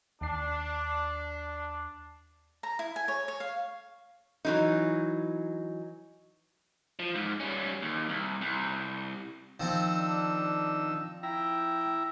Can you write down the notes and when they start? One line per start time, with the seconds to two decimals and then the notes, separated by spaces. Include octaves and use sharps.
0.21 D#2 D4 C7
2.63 A#5
2.79 E4
2.96 G#5
3.08 C#5
3.28 C#5
3.40 F5
4.45 E3 F#3 D#4
6.99 F3
7.15 G#2
7.40 G3 C#4
7.82 D#2
8.09 C2
8.41 C2
9.60 D#3 F3 C4 E6
9.96 D4
11.23 E4 G5 A#5